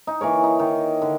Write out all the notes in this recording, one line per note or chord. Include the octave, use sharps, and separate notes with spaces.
D#4
E3 A#3 A#4 C#5
D#4
D#3
D3